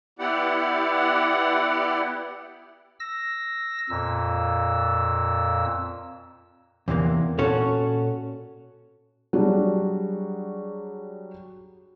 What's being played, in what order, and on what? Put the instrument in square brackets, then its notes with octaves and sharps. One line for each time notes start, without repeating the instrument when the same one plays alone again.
[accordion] B3 E4 G4 D5 F#5
[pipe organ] E6 A#6
F2 A#2 E6
[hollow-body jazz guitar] E2 C3 E3 A#3
A#2 C#4 F#4 A4 C#5
[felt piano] F#3 G3 D4 F#4 G#4